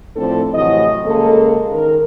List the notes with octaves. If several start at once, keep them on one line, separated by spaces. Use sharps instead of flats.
A2 F3 A3 C4 D4 A4
A2 C3 E3 F#3 D#5
C#3 G#3 A#3 A4
D#3 A#4